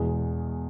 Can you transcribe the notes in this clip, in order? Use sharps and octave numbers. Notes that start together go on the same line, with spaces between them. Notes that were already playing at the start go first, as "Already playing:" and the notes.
Already playing: E2 B2 G#3